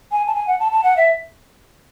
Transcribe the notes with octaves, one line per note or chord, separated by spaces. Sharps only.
G#5
A5
G#5
F#5
A5
A5
F#5
E5